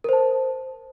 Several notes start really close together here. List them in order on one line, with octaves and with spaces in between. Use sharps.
A#4 C5 A5